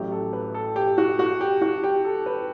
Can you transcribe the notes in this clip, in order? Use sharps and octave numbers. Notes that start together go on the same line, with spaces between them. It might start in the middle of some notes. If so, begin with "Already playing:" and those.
Already playing: A1 A2 F#3 G4
A4
B4
A4
G4
F#4
F#4
G4
F#4
G4
A4
B4